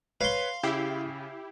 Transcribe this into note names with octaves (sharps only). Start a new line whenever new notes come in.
B4 C#5 F5 C6
C#3 E4 G4 C7